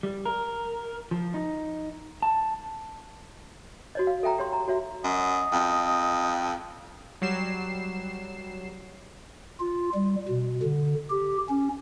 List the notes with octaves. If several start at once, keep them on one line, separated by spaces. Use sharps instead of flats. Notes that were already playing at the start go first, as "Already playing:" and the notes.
G3
A#4
F3
D#4
A5
F#4 C#5 D#5
F5
A4 E5 G5 A#5
G4 C#5 C6
A#5
F#4 C#5 E5
F#2 D#5
F2
F#3 G3 C7 E7
F4
G3
B2
D3
G4
C#4